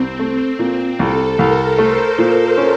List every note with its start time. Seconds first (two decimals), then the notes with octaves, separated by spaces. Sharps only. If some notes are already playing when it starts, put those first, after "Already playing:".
Already playing: C2 C4
0.19 A3
0.59 A#2
0.99 C2 A4
1.38 C2 A#4
1.78 A3 C5
2.18 A#2
2.57 C#4